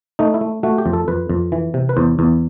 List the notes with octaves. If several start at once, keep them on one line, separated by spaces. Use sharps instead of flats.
A3 D#4
E4
A3
A3 F#4
G4
F2
A4
F2 B4
F2
E3
C3
B4
E2 C5
E2